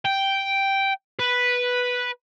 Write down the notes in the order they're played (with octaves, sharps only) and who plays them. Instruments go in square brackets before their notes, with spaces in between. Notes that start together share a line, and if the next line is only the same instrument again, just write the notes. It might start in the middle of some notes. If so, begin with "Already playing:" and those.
[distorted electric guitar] G5
B4